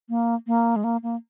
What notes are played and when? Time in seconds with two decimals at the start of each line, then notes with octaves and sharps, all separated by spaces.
0.09 A#3
0.47 A#3
0.76 G#3
0.84 A#3
1.03 A#3